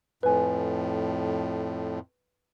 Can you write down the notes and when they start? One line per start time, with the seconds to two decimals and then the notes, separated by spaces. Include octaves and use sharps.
0.23 F2 A2 B4 G#5